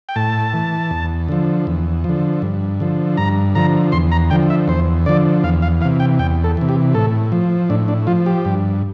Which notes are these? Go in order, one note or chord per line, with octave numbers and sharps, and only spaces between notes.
G5
A2 A5
E3
E2
D3 F3
E2
F3
D3
G2
D3 F3
G2 A#5
D3 F3 A#5
E2 C6
A#5
D3 F3 G5
E5
E2 C5
D3 F3 D5
E2 F5
F5
C3 E3 F5
G5
E2 G5
A4
C3 E3
G4
A2 A4
F3
A2 D4
D4
F3 F4
G4
G2